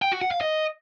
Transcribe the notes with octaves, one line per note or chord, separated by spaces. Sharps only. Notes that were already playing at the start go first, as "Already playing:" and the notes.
G5
F#4
F#5
F5
D#5